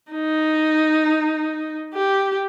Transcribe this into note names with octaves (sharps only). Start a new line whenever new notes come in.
D#4
G4